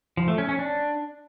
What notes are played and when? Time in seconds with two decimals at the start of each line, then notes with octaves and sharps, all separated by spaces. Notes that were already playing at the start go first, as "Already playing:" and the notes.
0.17 F3
0.28 A3
0.38 C#4
0.49 C#4
0.59 D4